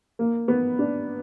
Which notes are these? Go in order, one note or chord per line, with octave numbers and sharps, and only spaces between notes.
A#3
B3
D4